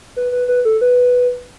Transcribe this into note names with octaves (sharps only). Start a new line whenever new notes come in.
B4
B4
B4
A4
B4